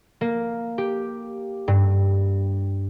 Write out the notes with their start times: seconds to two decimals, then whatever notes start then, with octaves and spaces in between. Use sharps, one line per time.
0.21 A#3
0.78 G4
1.68 G2